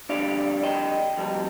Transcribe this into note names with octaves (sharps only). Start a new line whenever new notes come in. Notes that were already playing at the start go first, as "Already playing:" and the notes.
F2 D3 G3 D4 D5 F5
D#5 G5
F2 C3 G3